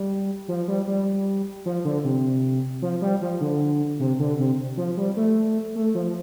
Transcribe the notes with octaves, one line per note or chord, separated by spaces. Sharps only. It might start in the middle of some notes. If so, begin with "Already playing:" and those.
Already playing: G3
F3
G3
G3
F3
D3
C3
F3
G3
F3
D3
C3
D3
C3
F3
G3
A3
A3
F3